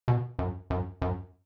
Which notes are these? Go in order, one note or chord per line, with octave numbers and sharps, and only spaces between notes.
B2
F#2
F#2
F#2